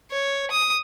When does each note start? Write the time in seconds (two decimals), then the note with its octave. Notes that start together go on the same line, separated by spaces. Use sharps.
0.11 C#5
0.51 D#6